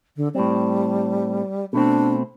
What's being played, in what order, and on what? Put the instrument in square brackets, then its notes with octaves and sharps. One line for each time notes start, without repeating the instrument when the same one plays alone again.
[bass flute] D3
[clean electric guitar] A2 C4 [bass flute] G3
[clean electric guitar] B2 A3 C4 [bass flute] D4